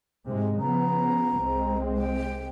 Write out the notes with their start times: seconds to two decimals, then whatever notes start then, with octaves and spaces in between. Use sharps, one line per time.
0.27 G#2 C3 G#3
0.59 C#3 F3 B3 A#5
1.40 C2 G#3 C4
1.97 G5